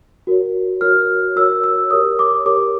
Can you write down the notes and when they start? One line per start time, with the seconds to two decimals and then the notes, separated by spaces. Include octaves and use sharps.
0.27 F#4 A#4 C#5
0.81 F#4 A#4 C#5 F6
1.36 F#4 A#4 C#5 E6
1.64 E6
1.91 G4 A#4 C#5 D#6
2.19 D6
2.46 G4 A#4 C#5 D6